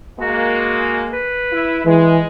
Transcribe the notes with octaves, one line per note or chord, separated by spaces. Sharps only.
G#3 A#3 F#4
B4
E4
E3 G#3